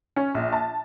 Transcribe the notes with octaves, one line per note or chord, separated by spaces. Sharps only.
C#4
A#1
A5